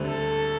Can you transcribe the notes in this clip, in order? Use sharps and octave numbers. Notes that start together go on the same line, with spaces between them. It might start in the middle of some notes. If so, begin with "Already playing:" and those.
Already playing: D2 D3 G3 C4
A4